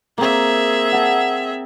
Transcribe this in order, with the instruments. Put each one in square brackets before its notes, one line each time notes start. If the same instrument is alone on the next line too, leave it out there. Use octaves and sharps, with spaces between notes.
[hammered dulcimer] A#3 C4 [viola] G#4 E5
[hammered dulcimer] F#5 A5